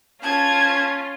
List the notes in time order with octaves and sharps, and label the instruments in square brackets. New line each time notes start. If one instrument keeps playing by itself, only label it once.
[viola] C#4 F4 [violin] A5 G#6